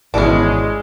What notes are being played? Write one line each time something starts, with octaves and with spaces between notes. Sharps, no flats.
G#1 B2 E3 G#3 C#4 D4